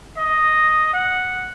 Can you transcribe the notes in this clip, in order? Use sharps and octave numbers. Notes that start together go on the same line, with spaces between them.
D#5
F#5